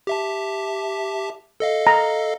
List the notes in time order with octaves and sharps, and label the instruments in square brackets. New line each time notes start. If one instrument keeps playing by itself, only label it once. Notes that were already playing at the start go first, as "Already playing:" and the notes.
[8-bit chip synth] G4 E5 A5
A4 D#5 F5
[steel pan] A#5